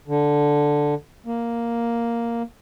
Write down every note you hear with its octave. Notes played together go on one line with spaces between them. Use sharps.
D3
A#3